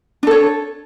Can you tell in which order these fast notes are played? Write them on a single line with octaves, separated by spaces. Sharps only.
D4 A4 C#5